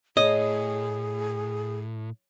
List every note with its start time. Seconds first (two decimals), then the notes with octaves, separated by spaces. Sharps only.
0.17 A2 G#4 C#5 D#5